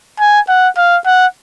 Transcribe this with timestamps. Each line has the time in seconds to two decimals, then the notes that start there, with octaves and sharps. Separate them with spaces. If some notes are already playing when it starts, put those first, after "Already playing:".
0.20 G#5
0.49 F#5
0.77 F5
1.06 F#5